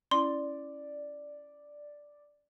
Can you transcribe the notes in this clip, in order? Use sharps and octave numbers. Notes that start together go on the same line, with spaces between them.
C#4 E4 D5 C6